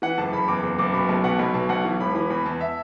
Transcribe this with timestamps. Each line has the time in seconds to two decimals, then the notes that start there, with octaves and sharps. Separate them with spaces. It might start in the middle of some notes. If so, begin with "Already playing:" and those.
0.02 E3 F#5
0.18 F#1 A5
0.33 F#1 B5
0.48 E2 D6
0.63 F#1
0.79 F#1 D6
0.94 B2 B5
1.09 B1 A5
1.24 B2 F#5
1.39 B1 B5
1.54 B2 A5
1.69 B1 F#5
1.85 E3
2.00 E1 B5
2.15 E3 B5
2.30 E2 B5
2.46 E2 A5
2.61 E5